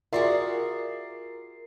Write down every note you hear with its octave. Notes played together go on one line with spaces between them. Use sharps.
F4 F#4 G#4 A#4 D5 E5 C7